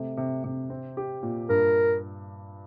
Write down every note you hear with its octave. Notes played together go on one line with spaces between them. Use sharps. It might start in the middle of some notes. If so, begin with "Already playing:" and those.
Already playing: C3 A3
C3
C3
C4
G4
A#2
G2 A#4